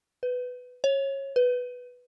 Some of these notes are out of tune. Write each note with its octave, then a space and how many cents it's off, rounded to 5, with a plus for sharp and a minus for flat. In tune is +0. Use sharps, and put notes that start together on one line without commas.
B4 +10
C#5 -20
B4 +0